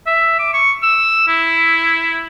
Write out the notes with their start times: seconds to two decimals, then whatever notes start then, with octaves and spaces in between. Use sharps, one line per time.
0.07 E5
0.39 D6
0.54 C#6
0.83 E6
1.28 E4